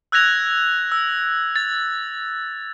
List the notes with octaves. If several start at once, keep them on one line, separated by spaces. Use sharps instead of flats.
E6 F#6 G#6 A#6 F7
E6
A6